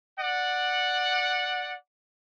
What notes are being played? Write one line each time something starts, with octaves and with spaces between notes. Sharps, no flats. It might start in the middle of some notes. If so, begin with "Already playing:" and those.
D5 F#5